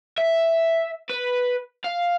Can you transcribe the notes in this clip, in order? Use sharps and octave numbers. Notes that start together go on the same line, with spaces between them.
E5
B4
F5